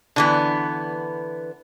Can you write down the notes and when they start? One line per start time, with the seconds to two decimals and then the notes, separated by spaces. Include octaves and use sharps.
0.16 D3 E3 B3